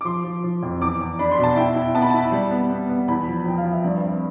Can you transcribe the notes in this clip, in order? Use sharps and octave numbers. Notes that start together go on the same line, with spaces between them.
D6
F3 C6
F3
F3
F2
E2 D6
E2
D4 B5
C6
B2
A5
E4 G5
E4
B3 A5
B5
E4 A5
G3
B3
B3
B3
E2 B5
F3
F3 G5
F5
F3
E5
G2 D5
C4